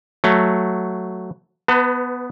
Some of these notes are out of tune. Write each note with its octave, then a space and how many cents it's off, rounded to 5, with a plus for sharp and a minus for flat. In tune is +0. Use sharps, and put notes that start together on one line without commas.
F#3 +0 A3 +0
B3 +0 B4 +30 A5 +45